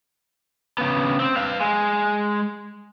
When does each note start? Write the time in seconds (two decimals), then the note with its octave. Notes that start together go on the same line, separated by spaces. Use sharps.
0.78 C#3 B3
1.20 C4
1.36 B4 F5
1.61 G#3